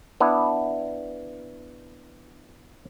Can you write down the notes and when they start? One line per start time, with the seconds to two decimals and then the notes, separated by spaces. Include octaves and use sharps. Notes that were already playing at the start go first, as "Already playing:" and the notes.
0.20 B3 D4 E4